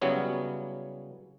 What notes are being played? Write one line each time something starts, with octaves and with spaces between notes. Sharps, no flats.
C#3 F#3 G3 B3 C#4 E4